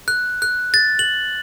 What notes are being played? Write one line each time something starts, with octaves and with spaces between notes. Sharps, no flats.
F#6
F#6
A6
F#7